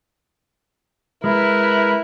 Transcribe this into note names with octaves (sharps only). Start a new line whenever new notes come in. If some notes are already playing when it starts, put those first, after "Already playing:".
G#3 E4 A#4 B4